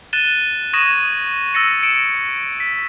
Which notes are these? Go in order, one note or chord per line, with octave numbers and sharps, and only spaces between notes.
F#6 A6 D#7 E7 G7
C#6 D#6 G#6 A#6 D#7 E7
E6 A6 A#6 C#7
C#7 D7 E7
B6